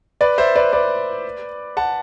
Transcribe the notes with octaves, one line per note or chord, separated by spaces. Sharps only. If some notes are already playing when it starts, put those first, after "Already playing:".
B4 D5
C5 E5
B4 D5
B4 D5
F#5 A5